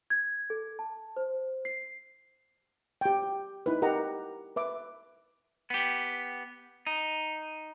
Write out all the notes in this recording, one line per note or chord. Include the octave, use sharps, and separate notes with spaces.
G#6
A4
A5
C5
C7
G4 G5
D#4 E4 B4
G4 A#4 D#5 F#5 A#5
B4 E5 D6
B3 G4
D#4